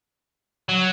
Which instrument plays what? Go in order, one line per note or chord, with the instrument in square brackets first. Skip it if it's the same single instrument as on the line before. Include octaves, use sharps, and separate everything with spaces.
[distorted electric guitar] F#3